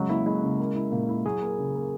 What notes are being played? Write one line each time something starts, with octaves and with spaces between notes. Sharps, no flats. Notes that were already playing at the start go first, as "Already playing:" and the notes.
Already playing: C#3 F#3 G#3
A#3 E4
G#3 E4
C#3
A#3
E4
A#2 A#3
E4
F#3 G#4
A#3
C#3
A#3